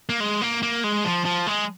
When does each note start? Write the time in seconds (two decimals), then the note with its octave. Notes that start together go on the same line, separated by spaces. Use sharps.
0.09 A#3
0.20 G#3
0.41 A#3
0.62 A#3
0.84 G#3
1.05 F3
1.25 F3
1.46 G#3